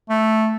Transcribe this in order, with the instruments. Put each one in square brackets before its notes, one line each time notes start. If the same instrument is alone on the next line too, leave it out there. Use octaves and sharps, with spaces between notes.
[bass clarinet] A3